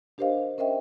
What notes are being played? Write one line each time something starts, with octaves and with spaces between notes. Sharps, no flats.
D4 G4 A#4 C5 D#5 F5
C#4 A#4 C5 D#5 E5 G5